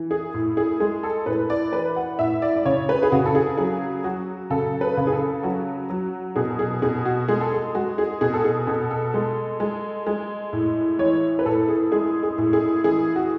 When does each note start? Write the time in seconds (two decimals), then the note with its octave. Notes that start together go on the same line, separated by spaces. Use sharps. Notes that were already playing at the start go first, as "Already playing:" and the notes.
Already playing: E3
0.11 G#4
0.34 A2
0.57 G#4
0.80 G#3 G#4
1.03 A4
1.26 A2 B4
1.50 D5
1.73 E3 B4
1.96 F#5
2.19 A2 E5
2.42 D5
2.56 D5
2.65 C#3 C#5
2.89 B4
3.03 G#4
3.12 C#3 F#4
3.26 A4
3.35 G#4
3.57 F#3 G#4
4.04 F#3 F#4
4.50 C#3 A4
4.81 B4
4.97 C#3
5.07 G#4
5.12 A4
5.43 F#3 F#4
5.90 F#3
6.36 B2 G#4
6.59 G#4
6.82 B2 G#4
7.05 F#4
7.28 G#3 G#4
7.41 A4
7.52 G#4
7.75 G#3 F#4
7.98 G#4
8.21 B2 G#4
8.34 A4
8.44 G#4
8.67 B2 A4
8.91 A4
9.14 G#3
9.60 G#3
10.07 G#3
10.53 A2
10.99 E3 C#5
11.39 B4
11.45 A2 A4
11.68 G#4
11.92 G#3 G#4
12.23 G#4
12.38 A2
12.53 G#4
12.84 E3 G#4
13.16 F#4